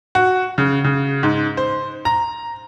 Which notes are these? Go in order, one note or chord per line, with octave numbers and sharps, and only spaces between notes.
F#4
C#3
C#3
G#2
C5
A#5